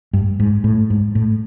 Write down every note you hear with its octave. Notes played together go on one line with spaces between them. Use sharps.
G2
G#2
A2
G#2
A2